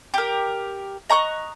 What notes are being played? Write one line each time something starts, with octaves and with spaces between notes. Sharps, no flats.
G4 A#4
D#5 A#5 C#6 F#6